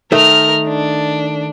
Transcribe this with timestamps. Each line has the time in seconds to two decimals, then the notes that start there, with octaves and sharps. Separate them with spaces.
0.12 D#3 A3 A#4 F6
0.68 D4